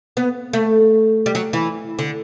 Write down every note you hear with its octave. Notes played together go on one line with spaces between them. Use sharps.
B3
A3
G3
F#3
E3
D3